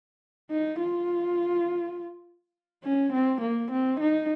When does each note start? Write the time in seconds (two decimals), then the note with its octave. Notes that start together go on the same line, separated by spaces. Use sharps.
0.50 D#4
0.79 F4
2.84 C#4
3.13 C4
3.41 A#3
3.71 C4
4.00 D#4